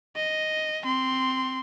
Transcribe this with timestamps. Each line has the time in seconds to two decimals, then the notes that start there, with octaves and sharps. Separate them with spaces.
0.16 D#5
0.83 C4 C6